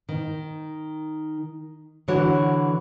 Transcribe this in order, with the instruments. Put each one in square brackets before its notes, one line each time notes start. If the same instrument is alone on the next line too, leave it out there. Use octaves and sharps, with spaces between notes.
[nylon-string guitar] D#3
D3 E3 F#4 C#5